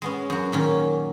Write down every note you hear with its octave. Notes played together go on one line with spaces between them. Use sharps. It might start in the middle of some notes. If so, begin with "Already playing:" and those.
G#3 B3 C#4
F#2 F#4
A#2 D#3 C#4